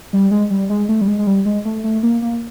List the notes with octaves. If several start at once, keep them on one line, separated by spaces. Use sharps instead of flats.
G3
G#3
G3
G#3
A3
G3
G#3
G#3
G3
G#3
A3
A3
A#3
A#3